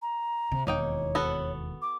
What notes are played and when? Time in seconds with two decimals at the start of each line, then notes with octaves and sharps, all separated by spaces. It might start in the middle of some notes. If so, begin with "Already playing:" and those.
0.02 A#5
0.52 C3
0.67 E1 D#2 A#3 D#4 C#5 G5
1.15 B3 F#4 A4
1.82 D6